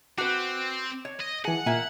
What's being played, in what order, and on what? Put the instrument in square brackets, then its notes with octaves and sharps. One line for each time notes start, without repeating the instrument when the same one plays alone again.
[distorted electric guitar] C4 [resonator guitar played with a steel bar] F#4 B4 [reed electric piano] D6
[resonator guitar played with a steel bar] C#5
[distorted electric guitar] D#5
[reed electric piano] E3 G#4 [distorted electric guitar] F#5 [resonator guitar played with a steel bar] G#5
[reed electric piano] A#2 [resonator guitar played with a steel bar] A#3 E5 G#5